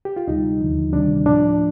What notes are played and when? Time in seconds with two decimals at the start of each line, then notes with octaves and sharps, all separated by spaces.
0.05 G4
0.17 F4
0.28 D2 C3 G3 D#4
0.61 D#2 D3 F3
0.93 D2 C3 D#3 G3 D4
1.26 A2 F3 D4